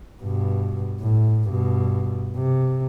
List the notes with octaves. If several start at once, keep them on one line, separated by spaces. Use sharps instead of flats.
G2 B2
A2
G2 B2
C3